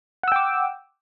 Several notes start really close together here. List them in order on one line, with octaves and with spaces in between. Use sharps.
F#5 E6 G5 D6